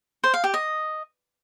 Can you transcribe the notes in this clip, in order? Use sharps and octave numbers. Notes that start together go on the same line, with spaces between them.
C5
F5
G4
D#5